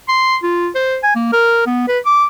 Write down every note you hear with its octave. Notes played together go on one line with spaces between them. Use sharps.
C6
F4
C5
G#5
A#3
A#4
B3
B4
D6